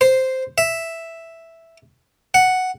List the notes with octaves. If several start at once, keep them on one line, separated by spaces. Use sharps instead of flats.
C5
E5
F#5